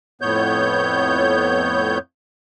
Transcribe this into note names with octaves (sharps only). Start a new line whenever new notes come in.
F2 A2 B3 C#5 G6